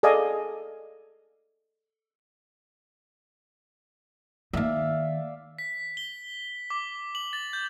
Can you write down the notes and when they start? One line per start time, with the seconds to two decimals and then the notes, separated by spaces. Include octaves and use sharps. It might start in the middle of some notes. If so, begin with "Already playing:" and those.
0.03 G#4 A4 D5 D#5 F5 G#5
4.53 D#3 A#3 D5 E5 F5
5.59 B6
5.97 G7
6.70 D6
7.15 F#7
7.33 A6
7.53 G6